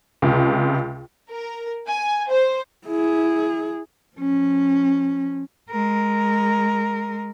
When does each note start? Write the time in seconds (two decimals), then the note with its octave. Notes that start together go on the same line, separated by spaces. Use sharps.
0.22 C#2 C3
1.29 A#4
1.89 G#5
2.30 C5
2.86 E4 G#4
4.17 F3 C#4
5.70 G#3 A#4